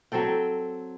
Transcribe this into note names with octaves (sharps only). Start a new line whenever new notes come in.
F#3 C4 A4 G5